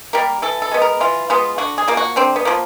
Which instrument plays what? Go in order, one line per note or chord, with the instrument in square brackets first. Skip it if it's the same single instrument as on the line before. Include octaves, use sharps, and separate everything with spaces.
[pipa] G3 A#3 A#4
E3 A4
A4
G#3 B3
A#4
E3 F4
G#3 B3 F4
D3 F#4
G#4
F3 A#3
F#4
D3 C4
B3
F3 A#3